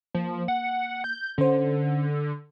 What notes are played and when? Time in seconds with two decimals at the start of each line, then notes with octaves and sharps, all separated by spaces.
0.15 F3 A#3
0.48 F#5
1.04 G6
1.38 D3 C#4 C5